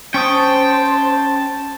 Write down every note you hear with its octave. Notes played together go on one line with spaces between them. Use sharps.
C#4 C5 G5 A5 C#6 D#6